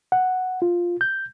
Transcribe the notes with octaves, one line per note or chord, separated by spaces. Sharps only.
F#5
F4
G6